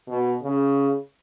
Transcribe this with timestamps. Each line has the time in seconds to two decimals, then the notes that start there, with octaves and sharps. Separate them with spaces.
0.08 B2
0.43 C#3